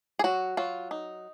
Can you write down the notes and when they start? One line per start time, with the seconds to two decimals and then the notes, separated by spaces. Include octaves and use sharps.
0.19 G#4
0.24 F#3 F#4
0.57 F#3 F4
0.91 D#4